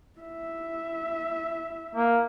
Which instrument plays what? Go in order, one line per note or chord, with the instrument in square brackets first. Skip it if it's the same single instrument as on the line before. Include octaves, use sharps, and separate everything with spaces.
[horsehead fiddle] E4 E5
[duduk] A#3